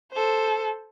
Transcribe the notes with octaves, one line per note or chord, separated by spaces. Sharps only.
A4 C5